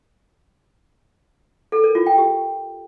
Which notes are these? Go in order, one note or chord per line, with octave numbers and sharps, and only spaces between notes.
A4
A#4
F4
G5
G4